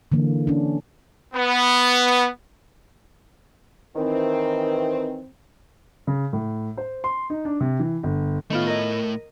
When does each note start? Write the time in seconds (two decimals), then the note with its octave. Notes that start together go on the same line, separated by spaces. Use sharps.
0.12 D3 E3 A#3
0.47 C#4 D4
1.34 B3
3.95 D#3 E3 C4
6.07 C#3
6.33 A2
6.77 C5
7.04 C6
7.30 D#4
7.45 D4
7.60 C3
7.79 E3
8.03 G1
8.50 A2 D#3 A3 B3 F4
8.67 A#4 D#5